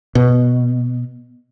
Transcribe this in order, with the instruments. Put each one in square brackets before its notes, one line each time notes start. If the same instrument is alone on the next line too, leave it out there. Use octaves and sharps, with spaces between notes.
[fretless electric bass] B2